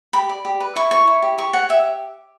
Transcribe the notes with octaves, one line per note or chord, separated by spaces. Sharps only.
G4 B5
D5
G4
B4
E4 C#6
C#5 C#6
E4
G4
G4 C#6
C#5 F#5
G4 E5